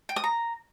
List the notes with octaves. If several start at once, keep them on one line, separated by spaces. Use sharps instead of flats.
G5
D#6
A#5